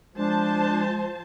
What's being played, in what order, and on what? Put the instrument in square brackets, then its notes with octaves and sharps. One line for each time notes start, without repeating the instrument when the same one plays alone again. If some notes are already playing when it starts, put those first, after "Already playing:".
[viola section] F3 C5 A5 [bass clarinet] G#3 [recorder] D4